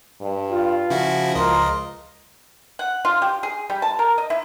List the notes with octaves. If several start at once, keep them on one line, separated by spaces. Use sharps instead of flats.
G2
F4
C#3 F3 E4 F#4
C#2 A#4 D#5 C6
F#5
F4
G4
G#4
G3
A5
A#4
D#5
E4